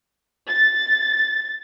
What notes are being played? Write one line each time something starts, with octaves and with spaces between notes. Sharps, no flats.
A6